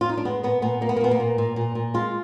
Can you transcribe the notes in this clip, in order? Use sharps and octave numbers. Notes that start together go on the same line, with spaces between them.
F4
D#4
D4
G#3 B3
A#2 B3
A#2 B3
A#2 A#3
B3
A#3
A#2 B3
A#3
A#2
A#2
A#2
A#2
G#3 F4